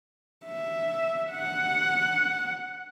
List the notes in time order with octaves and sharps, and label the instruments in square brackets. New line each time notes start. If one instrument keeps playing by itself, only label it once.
[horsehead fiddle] E5
F#5